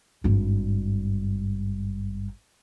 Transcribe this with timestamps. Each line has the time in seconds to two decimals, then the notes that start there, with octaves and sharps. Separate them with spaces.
0.24 G#1 G2